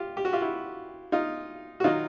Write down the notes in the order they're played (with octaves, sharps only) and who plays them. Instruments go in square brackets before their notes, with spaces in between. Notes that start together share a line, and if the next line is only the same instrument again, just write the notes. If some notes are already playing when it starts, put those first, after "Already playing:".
Already playing: [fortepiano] F4 G4
G4
F#4
F4 G4
E4 F#4
D#4 F4
F#4
D#3 F#3 D#4 F4